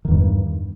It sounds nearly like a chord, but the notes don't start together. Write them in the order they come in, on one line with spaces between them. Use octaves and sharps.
D#3 E2 G2